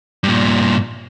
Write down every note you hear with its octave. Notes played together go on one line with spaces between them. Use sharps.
G2 A#2